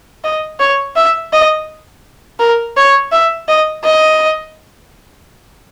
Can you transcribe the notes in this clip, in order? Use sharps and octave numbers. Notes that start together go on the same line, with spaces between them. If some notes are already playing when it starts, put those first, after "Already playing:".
D#5
C#5
E5
D#5
A#4
C#5
E5
D#5
D#5